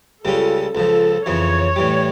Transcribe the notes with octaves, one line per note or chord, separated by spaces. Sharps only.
C#2 C#3 G3 C#4 F4 A4
C#2 C#3 F3 A4
F2 C#3 E3 C#5
A2 E3 G3